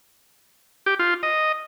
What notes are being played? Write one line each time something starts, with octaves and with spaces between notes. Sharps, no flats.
G4
F4
D#5